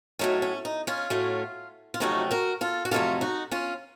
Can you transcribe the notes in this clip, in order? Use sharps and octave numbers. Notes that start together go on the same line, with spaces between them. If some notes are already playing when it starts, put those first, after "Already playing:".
A2 F#3 A3 C#4 D#4
C#4
D#4
C#4 F4
A2 F#3 A3 C#4
F4
F2 C3 F#3 A3 C#4 D#4 F#4
F#4 A#4
F4 A4
F#4
F2 C3 F#3 A3 C#4 F4 A4
D#4 F#4
C#4 F4